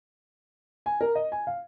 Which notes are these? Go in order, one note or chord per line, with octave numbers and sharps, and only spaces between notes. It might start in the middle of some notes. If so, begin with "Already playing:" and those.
G#5
A#4
D#5
G#5
F5